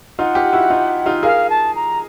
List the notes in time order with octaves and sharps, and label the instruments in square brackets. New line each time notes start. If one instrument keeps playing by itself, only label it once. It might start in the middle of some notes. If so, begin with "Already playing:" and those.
[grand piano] D#4 F4 [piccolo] F#5
[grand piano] F4 G4
E4 F#4
D#4 F4
D#4 F4
[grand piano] G#4 A#4 [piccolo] F5
[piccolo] A5
A#5